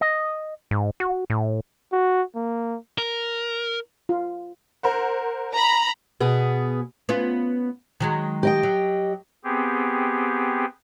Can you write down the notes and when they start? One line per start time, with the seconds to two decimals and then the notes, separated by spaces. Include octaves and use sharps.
0.01 D#5
0.71 G#2
1.00 F#4
1.30 A2
1.92 F#4
2.36 A#3
2.98 A#4
4.09 F4
4.83 A#4 C5 F#5
5.53 A#5 B5
6.20 B2 B3 G#4
7.09 B3 C#4 F4
8.00 D#3 F#3 G#3
8.43 G4 D#5 G5
8.63 F#3
9.44 B3 C4 G4 G#4